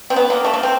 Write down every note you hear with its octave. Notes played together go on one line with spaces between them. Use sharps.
C4
B3
A#3
A3
A#3
C4